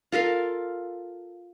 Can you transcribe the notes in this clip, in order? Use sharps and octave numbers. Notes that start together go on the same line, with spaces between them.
F4 A4 A#4 F5